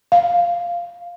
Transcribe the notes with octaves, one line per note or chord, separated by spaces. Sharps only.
F5